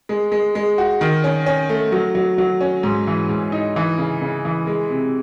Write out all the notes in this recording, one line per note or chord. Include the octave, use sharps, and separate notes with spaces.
G#3
G#3
G#3
F#4
D#3
C#4
C#4
A3
F#3
F#3
F#3
C#4
G#2
E3
G#2
D#4
E3
C#3
C#3
E3
G#3
C3